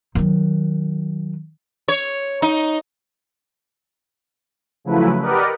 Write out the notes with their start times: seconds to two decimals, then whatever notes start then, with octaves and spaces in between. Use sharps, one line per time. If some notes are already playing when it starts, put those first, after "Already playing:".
0.15 D#3 F#3
1.88 C#5
2.42 D#4
4.84 C#3 F3 F#3 A3 E4 B4
5.21 G4 A#4 B4 D5 D#5 F#5